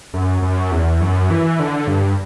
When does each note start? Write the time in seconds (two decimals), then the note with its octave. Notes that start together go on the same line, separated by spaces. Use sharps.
0.14 F#2
0.42 F#2
0.71 E2
1.01 F#2
1.30 E3
1.59 D3
1.87 G2